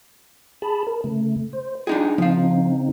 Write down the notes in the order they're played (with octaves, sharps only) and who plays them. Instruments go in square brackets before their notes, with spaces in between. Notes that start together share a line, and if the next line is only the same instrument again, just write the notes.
[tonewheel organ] G#4 A5 B5
A#4
C#3 A3
C5
[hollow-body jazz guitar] D4 D#4 G#4 [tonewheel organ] F4 G5
[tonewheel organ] C#3 C4 D#4 [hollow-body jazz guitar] F3 F5